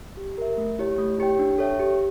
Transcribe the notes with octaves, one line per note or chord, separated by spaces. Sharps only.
G4
A#4 E5
A3
E4 G4 C#5
A3
E4 G4 C#5 G5
D4
A4 C#5 E5 G5
G4